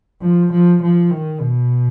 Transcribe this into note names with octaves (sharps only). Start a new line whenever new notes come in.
F3
F3
F3
D#3
B2